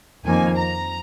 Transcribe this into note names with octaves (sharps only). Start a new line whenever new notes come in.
F2 D#3 A#3 G#5
A#5